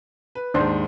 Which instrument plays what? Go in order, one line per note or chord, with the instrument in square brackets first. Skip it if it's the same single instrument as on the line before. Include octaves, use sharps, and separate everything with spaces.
[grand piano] B4
[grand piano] D#2 G#2 [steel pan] D4 C5